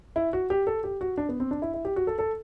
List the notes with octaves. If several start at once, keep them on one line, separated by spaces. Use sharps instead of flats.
E4
F#4
G4
A4
G4
F#4
D4
B3
C4
D4
E4
E4
G4
F#4
A4
A4